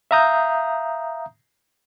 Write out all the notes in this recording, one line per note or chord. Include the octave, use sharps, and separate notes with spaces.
E5 F5 A#5 D#6 G6